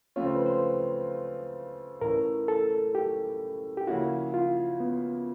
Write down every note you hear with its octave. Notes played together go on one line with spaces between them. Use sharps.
C#3 F3 A3 C4 F4 C#5
C5
B4
C5
A2 E3 A3 C#4 A#4
A4
G4
G4
C#3 F3 A#3 C#4 E4 F#4
F4
B3